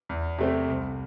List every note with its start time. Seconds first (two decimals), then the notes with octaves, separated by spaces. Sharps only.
0.09 E2
0.38 C3 A3 C4
0.69 C2